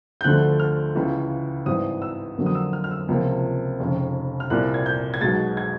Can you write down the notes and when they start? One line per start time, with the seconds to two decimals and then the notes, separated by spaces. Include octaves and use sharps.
0.21 G6
0.24 D2 D3 F3 A3 F#6
0.60 F6
0.95 C#2 C#3 E3
1.66 G#1 G2 E3 D#6
2.02 E6
2.37 F2 D3 F#3 A#3
2.46 D#6
2.55 E6
2.73 F6
2.84 F6
2.91 E6
3.08 C#2 C3 F3 A#3
3.80 F1 F2 C#3
4.40 F6
4.50 C2 A#2 G3 A#3 F#6
4.74 G#6
4.86 G6
5.14 G#6
5.21 B1 B2 G#3 A6
5.57 G#6